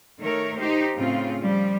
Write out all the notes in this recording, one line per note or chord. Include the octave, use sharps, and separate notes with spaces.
D#3 A3 A#4 C#5
D#4 G4 C5
A2 C#3 C4 F4
F3 G3